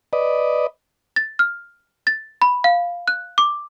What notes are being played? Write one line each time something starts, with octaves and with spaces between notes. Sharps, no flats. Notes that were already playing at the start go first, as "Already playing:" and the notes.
B4 D5 D#5
A6
F6
A6
B5
F5
F#6
D6